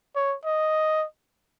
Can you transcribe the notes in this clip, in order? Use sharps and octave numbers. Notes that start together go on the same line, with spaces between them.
C#5
D#5